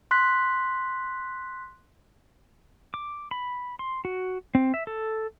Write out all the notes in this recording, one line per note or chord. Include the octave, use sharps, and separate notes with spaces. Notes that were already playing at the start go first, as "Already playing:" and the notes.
C6 F#6 B6
D6
B5
C6
F#4
C4
E5
A4